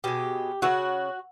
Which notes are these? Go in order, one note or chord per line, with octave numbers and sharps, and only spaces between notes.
B2 G#3 G4
C#3 E3 F#4